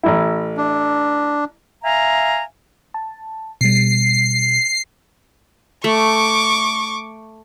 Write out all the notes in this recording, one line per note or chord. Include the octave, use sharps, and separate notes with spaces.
A1 E4
D4
E5 F5 G#5 A#5
A5
B2 G3 C7
A3 C#6 D6